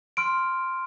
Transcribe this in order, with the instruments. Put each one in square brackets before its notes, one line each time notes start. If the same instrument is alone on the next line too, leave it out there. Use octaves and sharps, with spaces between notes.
[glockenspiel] C6 F6 D7